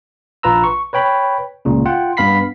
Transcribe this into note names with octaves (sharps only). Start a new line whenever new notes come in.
A#1 F4 B4 A#5 E6
C#6
B4 C#5 G5 B5
C#2 A#2 C#3
F4 F#5 G5
G2 B3 F5 B5 B6 C7